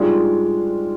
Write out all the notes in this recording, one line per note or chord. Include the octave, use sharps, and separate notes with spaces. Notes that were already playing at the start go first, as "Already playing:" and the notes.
Already playing: G#2 G3 G#3 D4 F4